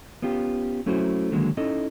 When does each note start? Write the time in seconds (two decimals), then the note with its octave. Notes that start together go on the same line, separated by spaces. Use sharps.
0.22 B3 C#4 F4 G4
0.86 F#3 A3 C#4 E4 F#4 C5
1.32 D3 D#3 F#3 G#3 A#3
1.57 C#4 D#4 E4 A4 D#5